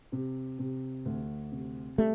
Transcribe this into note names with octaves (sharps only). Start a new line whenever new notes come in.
C3
C3
D2
C3
G3 A3